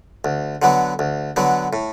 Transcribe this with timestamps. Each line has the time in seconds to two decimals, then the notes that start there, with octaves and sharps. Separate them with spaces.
0.25 D2
0.62 D3 F#3 B3
0.99 D2
1.36 D3 F#3 B3
1.73 A2